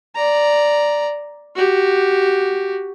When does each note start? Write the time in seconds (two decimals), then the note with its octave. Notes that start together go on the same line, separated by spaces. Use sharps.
0.16 D5 A#5
1.55 F#4 G4